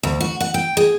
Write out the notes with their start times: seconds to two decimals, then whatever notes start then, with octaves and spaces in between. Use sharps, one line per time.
0.03 D2
0.21 F#4
0.40 F#5
0.54 G5
0.77 G#4